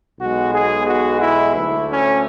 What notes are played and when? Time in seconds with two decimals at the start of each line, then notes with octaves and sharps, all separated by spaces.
0.20 B1 B2 G#3 F#4
0.53 G#4
0.86 F#4
1.21 E4
1.54 D2 D3 A3 E4
1.89 C#4